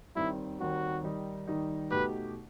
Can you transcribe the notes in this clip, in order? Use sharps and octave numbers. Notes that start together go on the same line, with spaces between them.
D#2 D#3 G3 C4 E4
D#2 D#3 G3 C4 F#4
D#3 G3 D#4
D#3 G3 D#4
B2 A3 D#4 G4 B4